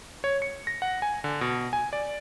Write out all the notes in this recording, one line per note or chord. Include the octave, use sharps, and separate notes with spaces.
C#5
C#7
A#6
F#5
G#5
D3
B2
G#5
D5